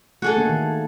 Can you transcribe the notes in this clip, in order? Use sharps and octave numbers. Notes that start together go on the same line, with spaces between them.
A3 F#4 G#4 A4
A#3 D4
D#3